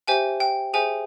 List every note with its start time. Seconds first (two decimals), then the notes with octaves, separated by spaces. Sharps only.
0.07 G4 C5 E5 G5 G#5
0.40 G5
0.74 G#4 C5 E5 G5 G#5